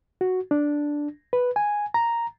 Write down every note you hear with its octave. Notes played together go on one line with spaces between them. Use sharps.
F#4
D4
B4
G#5
A#5